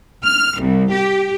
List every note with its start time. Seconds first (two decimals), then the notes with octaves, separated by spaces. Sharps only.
0.25 F6
0.61 C2
0.93 G4